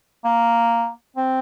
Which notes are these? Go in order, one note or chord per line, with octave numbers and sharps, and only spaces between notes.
A#3
C4